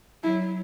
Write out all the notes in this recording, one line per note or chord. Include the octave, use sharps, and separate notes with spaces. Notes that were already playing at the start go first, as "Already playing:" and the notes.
F#3 E4